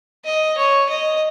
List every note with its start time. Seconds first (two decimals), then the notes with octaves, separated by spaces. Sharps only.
0.25 D#5
0.57 C#5
0.89 D#5